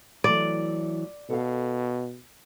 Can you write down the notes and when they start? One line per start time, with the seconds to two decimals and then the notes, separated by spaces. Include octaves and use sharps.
0.24 E3 F#3 A3 D5
1.30 B2 A4 F5